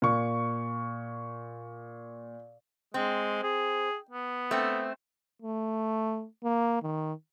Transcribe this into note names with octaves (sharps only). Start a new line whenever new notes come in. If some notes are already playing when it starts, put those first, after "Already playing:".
A#2 C#6
G#3 C4
G#4
B3
A3 C4
A3
A#3
D#3